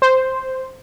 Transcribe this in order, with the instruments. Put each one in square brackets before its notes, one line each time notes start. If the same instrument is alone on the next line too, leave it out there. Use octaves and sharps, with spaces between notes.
[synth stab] C5